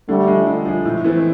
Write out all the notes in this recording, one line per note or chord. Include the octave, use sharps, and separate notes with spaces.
D3 G3 A3
F3 G#3
D3
F3 G#3
A2
E3 A3 C4